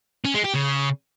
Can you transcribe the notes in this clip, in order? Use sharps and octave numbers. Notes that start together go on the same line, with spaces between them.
C#4
G#3
G4
C#3